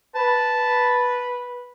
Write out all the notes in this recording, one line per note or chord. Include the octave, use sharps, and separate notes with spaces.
B4 A5